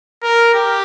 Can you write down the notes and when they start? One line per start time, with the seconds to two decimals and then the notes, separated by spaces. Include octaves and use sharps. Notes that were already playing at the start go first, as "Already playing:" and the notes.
0.23 A#4
0.54 G4